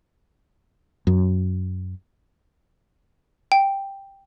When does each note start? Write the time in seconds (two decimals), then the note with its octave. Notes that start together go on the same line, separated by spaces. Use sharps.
1.07 F#2
3.52 G5